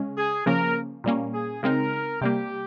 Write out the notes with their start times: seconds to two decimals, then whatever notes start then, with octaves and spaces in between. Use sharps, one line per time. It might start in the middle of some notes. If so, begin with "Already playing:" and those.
Already playing: C#3 G#3 C#4
0.17 G#4
0.46 C#3 F3 A#3 C#4 A#4
1.04 A#2 G3 A#3 C#4
1.34 G#4
1.63 C#3 G#3 C4 D#4 A#4
2.21 C3 G3 A#3 G4